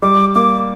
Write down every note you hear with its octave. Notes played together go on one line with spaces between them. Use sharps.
G3 D6
A#3 D6